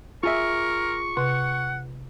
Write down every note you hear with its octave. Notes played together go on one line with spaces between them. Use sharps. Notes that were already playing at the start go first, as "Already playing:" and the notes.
F4 G#4 A#4 E5 C#6
C3 F#5